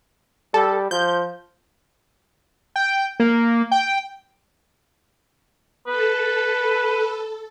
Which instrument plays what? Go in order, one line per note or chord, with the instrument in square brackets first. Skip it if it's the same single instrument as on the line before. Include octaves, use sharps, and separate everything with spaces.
[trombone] G3 [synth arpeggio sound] A4
[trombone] F3 [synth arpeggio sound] G6
[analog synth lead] G5
A#3
G5
[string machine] A4 [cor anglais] B4